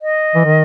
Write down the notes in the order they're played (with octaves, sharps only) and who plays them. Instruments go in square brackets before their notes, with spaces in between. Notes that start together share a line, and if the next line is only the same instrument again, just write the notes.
[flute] D#5
[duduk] E3
D#3